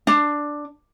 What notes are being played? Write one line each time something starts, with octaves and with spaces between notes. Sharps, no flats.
D4